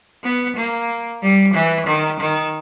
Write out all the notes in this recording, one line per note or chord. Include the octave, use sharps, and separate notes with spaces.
B3
A#3
G3
E3
D#3
D#3